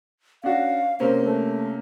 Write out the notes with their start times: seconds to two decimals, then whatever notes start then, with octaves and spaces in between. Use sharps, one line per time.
0.43 C#4 D4 F#4 F5
1.00 C3 A#3 C#4 C5
1.25 A3